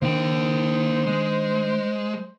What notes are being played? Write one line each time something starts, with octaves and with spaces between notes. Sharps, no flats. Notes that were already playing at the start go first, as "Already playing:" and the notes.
D#3 A#3 C#4 D4 C5 G5
G#3